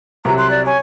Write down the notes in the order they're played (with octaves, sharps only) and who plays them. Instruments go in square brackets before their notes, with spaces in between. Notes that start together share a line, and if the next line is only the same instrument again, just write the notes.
[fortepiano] C2 C3 F#3 [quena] A#5
[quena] C6 [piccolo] F#6
[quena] D5
[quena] C#5 [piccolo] G#5